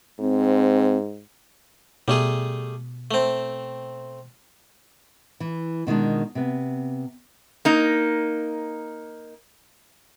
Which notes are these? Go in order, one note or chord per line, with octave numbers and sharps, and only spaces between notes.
G#2 C4
B2 G3 A3 G#4
A3 C4
E3
B2 D#3 G#3 D4
C3 B3
A#3 D#4